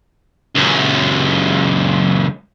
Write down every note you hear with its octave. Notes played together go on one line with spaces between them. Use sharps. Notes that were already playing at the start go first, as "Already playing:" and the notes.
C#2 F#2